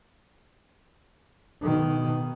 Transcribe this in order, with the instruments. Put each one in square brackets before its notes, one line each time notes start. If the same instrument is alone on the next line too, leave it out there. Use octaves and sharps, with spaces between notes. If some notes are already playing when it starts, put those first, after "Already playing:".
[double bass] B2 D#3